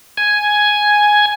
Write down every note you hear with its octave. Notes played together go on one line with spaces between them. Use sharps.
G#5